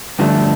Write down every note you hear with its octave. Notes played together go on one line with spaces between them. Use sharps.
G2 D3 F3 A3 D4